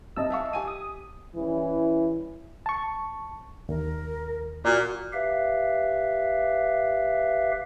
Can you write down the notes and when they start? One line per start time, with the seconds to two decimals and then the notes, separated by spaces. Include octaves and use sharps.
0.16 C2 D#5 A5 E6
0.30 E5 F5 C#6
0.53 G4 G#5 D#7
0.68 D#6
1.34 E3 G3 C#4 E4
2.66 A5 C#6
3.69 D#2 A#4
4.65 A#2 F#4 D5
5.13 G4 B4 E5 F5